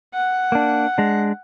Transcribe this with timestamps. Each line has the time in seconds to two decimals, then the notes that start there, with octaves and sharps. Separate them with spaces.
0.14 F#5
0.52 A#3 D4
0.98 G#3 D4